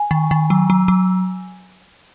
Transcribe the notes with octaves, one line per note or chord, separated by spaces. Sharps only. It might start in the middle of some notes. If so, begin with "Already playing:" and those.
Already playing: G#5
D#3
D#3
F#3
F#3
F#3